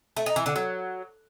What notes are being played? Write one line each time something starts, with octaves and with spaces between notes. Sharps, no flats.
A3
D#4
E3
D3
F#3